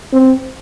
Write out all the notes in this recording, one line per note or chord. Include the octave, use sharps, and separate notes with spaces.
C4